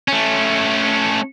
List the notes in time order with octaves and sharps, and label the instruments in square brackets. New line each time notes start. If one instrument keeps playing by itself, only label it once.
[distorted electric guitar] A3 C#4